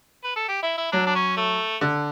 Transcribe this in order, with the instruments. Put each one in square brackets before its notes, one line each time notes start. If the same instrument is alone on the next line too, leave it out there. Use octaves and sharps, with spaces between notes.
[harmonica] B4
A4
G4
E4
E4
[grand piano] F#3 [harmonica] D4
[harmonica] D4
C#4
A3
[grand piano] D3